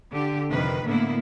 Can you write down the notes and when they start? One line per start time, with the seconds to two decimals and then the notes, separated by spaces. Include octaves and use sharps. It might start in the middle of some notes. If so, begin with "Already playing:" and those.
0.11 D3 G4
0.50 F2 C3 D#3 B4
0.86 A2 D3 A#3 B3 E4